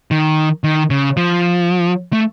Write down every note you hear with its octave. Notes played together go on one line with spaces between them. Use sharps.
D#3
D#3
C#3
F3
A3